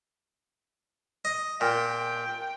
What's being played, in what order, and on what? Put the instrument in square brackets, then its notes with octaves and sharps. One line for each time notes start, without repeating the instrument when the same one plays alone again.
[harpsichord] D#5
[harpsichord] A#2 [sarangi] G5